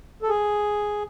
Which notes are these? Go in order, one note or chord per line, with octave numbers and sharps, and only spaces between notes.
A4
G#4